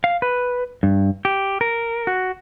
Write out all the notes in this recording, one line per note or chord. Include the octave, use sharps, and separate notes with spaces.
F5
B4
G2
G4
A#4
F#4